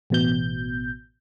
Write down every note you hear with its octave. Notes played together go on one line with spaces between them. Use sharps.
A1 B2 G6